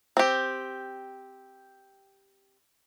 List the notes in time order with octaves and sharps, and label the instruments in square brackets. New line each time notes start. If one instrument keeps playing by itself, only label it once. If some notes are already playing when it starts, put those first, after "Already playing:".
[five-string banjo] C4 G4